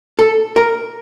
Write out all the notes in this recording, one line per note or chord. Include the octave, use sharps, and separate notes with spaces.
A4
A#4